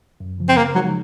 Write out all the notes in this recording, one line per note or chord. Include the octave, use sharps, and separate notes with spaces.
F#2
C#3 F3
C4
C#3 A#3
F3 F#3 G#3 D#4